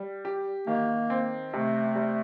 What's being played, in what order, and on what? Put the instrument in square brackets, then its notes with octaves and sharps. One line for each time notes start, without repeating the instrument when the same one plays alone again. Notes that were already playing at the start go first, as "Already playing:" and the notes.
Already playing: [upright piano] G3
G4
[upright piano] D#3 [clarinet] A#3
[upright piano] C4
[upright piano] C3 [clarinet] A3
[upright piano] G3